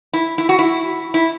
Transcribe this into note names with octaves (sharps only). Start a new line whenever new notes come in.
E4
E4
F#4
E4
E4